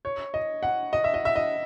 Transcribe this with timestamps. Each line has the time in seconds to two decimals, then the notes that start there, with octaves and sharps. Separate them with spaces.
0.05 C#5
0.34 D#5
0.63 F#5
0.93 D#5
1.04 E5
1.14 D#5
1.25 E5
1.36 D#5